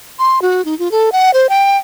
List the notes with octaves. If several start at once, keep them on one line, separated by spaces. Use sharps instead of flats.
C6
F#4
D#4
F4
A4
F#5
C5
G5